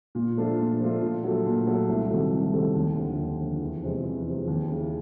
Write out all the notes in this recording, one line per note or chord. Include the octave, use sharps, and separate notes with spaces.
A#2
F3 A3 D4 F4
A#2
F3 A3 D4 F4
A#2
F#3 A3
A#2
F#3 A3
C2
C3 D#3 F#3 A3
C2
C3 D#3 F#3 A3
D#2
D3 F3
D#2
D3 F3
E2
C3 F3 G#3
E2
C3 F3 G#3
D#2
C#3 E3